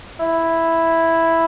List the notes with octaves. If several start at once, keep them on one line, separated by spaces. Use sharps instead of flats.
E4